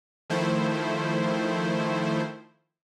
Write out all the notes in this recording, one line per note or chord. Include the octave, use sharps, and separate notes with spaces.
D#3 F3 A3 E4 C5